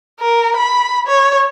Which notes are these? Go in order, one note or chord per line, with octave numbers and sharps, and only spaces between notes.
A#4
B5
C#5